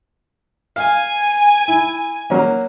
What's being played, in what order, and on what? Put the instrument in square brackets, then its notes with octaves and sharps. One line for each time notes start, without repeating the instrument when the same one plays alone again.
[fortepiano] F5 [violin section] G#5
[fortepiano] E4
F#3 A#3 C#4